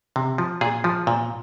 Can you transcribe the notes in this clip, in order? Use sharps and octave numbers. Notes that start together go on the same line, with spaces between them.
C3
F3
A#2 G#4
F3
A#2